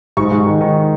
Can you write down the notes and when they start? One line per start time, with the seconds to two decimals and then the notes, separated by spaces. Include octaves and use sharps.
0.17 G#2 C#6
0.32 G#2
0.46 D#3
0.61 D#3